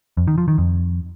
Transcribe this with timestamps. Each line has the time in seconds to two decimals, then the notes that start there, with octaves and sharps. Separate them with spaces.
0.17 F2
0.28 D#3
0.38 F3
0.48 D#3
0.58 F2